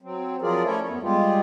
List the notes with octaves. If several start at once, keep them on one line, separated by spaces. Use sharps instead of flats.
F#3 C4
F3 F#3 F4 G#4 A#4 D5
A3 C#4 E4 A4 C#5 E5
F#2 B3
G3 G#3 F4 G4 G#4